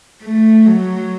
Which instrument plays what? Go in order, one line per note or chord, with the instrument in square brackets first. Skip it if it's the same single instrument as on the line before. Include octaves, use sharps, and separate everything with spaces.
[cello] A3
F#3